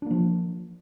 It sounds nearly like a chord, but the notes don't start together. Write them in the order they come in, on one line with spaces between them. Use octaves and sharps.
D4 A#3 F3